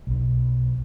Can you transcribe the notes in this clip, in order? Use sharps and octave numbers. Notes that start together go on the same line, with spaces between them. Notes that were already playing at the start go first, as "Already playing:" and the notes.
B1